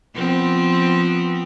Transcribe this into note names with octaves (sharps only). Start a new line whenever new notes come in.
F3 B3 C4